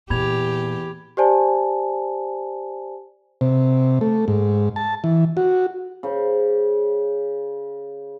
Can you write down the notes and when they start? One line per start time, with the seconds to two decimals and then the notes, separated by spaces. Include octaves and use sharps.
0.10 E2 A#2 G4 B5 G#6 F7
1.17 G4 C5 D5 G#5 A5
3.41 C3
4.01 A3
4.28 G#2
4.76 A5
5.04 E3
5.37 F#4
6.03 C#3 C5